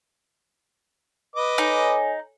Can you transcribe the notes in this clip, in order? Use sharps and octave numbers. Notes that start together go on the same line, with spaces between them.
B4 D#5 D6
D#4 A4 C#5 G#5